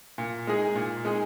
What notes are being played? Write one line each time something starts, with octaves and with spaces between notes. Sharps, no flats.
A#2
G#3 D#4 G#4
A#2
G#3 D#4 G#4